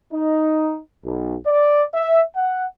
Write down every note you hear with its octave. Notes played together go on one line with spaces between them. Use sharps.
D#4
B1
D5
E5
F#5